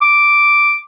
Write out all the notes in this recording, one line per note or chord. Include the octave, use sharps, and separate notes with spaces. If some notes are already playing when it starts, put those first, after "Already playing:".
D6